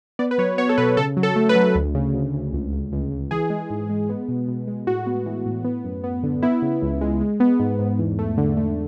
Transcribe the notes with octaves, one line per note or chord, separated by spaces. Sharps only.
B3 D5
B4
F#3 C#5
B3 C#5
A4
B2 B4
C#3 A4
F#3
A4
A3
B4
F#3
D2
C#3
D2
D2
C#2
C#2
C#2
C#2
E3 G#4
G#3
G#2
G#3
B3
B2
B2
G#3
A2 F#4
B3
E3
A2
B3
F#2
B3
D3
B3 E4
C#3
C#2
G#3
G#3
B3
G#2
G#2
E2
A3
D3
A3